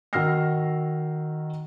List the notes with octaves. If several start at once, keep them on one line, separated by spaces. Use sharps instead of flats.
D#3 F#4 E6 F6 A#6 C7